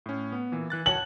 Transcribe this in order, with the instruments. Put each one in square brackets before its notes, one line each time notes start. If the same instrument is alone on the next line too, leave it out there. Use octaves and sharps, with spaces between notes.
[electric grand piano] A2 C#4
B3
A#2 E3
E3 F#6 A6
[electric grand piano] F#4 C#5 A5 [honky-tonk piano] F#7